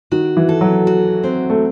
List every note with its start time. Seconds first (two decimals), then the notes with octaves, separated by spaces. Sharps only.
0.12 D#3 F#4
0.37 E3
0.49 A4
0.61 F#3
0.87 F#4
1.24 C4
1.50 A3